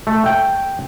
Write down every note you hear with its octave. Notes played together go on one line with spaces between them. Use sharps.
A3
G5